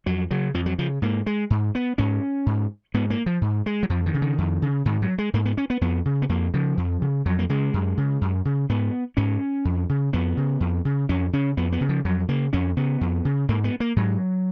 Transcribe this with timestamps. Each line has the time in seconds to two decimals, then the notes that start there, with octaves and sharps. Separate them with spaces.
0.06 F2 F#3
0.31 C#3 F#3
0.54 F2 F3
0.66 F#3
0.78 C#3 F3
1.02 G#2 A#3
1.26 G#3
1.50 G#2
1.75 B3
1.98 G#2 C#4
2.46 G#2
2.94 G#2 B3
3.10 A#3
3.26 F3
3.41 G#2
3.66 G#3
3.83 F#3
3.90 F2 F3
4.06 D#3
4.14 C#3
4.22 D#3
4.38 F2
4.62 C#3
4.85 G#2 D#3
5.02 F#3
5.18 G#3
5.33 G#2 A#3
5.45 B3
5.57 C#4
5.70 B3
5.81 F2 B3
6.05 C#3
6.22 B3
6.29 F2 A#3
6.54 C#3 F3
6.77 F2
7.02 C#3
7.26 F2 F#3
7.39 A#3
7.49 C#3 G#3
7.74 F#2
7.97 C#3
8.21 F#2
8.45 C#3
8.69 G#2 B3
9.17 G#2 C#4
9.65 F2
9.89 C#3
10.13 F2 B3
10.37 C#3
10.60 F2
10.85 C#3
11.09 F2 C#4
11.33 C#3 C#4
11.57 F2 B3
11.72 B3
11.81 C#3
11.89 F3
12.05 F2 F#3
12.28 C#3 A#3
12.53 F2 C#4
12.77 C#3 B3
13.01 F2
13.25 C#3
13.49 G#2 A#3
13.64 B3
13.80 A#3
13.96 G#2 F#3